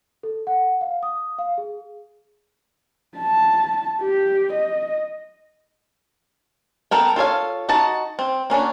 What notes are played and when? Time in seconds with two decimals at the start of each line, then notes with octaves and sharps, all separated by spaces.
0.23 A4
0.47 F#5
0.81 F5
1.03 D#6
1.39 F5
1.58 G#4
3.17 A5
4.02 G4
4.53 D#5
6.91 B3 A4 A#4 G5
7.16 F4 A4 C#5 F5
7.69 D#4 F#4 D#5 A5
8.19 C4
8.50 A#3 C#4 D4 F#4